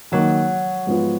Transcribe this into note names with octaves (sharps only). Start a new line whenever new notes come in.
D#3 F#3 A#3 D#4
G#2 F3 B3 F4